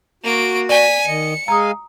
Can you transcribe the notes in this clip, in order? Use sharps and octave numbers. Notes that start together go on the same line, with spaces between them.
A#3 F#4 D7
D5 G#5 B6
D#3 D#5 C#7
G#3 F5 G#5 A#5 D#6